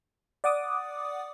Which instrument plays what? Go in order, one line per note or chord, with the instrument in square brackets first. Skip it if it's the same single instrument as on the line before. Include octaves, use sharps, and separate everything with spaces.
[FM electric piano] D5 F#5 D6 D#6